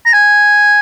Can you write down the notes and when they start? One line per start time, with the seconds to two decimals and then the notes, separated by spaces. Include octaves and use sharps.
0.06 A#5
0.13 G#5